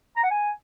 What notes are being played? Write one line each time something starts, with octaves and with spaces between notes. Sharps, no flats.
A#5
F#5
G#5